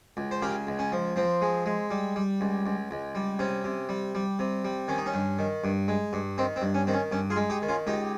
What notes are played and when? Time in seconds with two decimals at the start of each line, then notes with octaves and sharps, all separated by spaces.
0.17 C#2
0.31 C5
0.42 C#3 G4 A#4
0.67 C#2
0.79 C#4
0.92 F3
1.16 F3 C4
1.42 G#3
1.66 G#3
1.91 G3
2.16 G3
2.41 C#2
2.66 C#2
2.91 C#2
3.15 G3
3.39 C3 C#4
3.64 C3
3.89 G3
4.15 G3
4.39 C3
4.65 G3
4.88 D#3 C#4
4.98 D#4
5.06 C#4
5.14 G2
5.39 D#3
5.64 G2
5.88 G#3
6.13 G2
6.38 D#3 C4
6.56 C4
6.62 G2
6.75 C#4
6.87 D#3 C4
6.94 C#4
7.12 G2 C#4
7.30 F4 G#4
7.36 G#3
7.50 D#4 G4
7.62 D#3
7.68 C#4 F4
7.87 C#2 D#4 G4